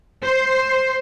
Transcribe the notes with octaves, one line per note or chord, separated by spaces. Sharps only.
C5